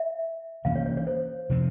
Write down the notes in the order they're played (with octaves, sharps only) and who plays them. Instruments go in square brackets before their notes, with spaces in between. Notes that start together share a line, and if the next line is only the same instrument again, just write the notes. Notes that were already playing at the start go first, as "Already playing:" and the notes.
Already playing: [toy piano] E5
[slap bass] C3 E3 A#3 C#4 [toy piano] F5
[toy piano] C#5
C#5
C#5
C5
[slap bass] C3 F3 C4